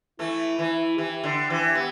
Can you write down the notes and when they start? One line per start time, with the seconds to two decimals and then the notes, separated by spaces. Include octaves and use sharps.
0.19 E3 A3 E4
0.59 E3 E4
0.98 E3 G4
1.24 D3
1.50 E3
1.75 B3